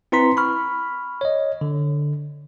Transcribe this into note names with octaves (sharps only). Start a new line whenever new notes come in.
C4 E4 B4 A#5 C6 B6
B5 C#6 F6
C#5 D#5
D3